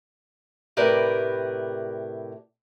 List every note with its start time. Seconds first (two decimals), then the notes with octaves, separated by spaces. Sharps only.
0.77 A2 C3 G4 A#4 B4 D5